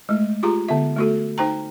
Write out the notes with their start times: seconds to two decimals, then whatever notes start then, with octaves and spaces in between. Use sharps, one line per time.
0.09 G#3 A3
0.43 F4 G4 G#4 A#5
0.68 D3 B3 E5
0.96 A3 F#4 A4
1.38 D#4 C5 G5 A#5